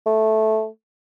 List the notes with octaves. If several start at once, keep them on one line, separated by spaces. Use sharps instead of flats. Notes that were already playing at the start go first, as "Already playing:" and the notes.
A3